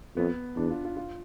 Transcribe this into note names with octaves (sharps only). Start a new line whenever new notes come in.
F2 B3
E2 D4
F4
F4
F4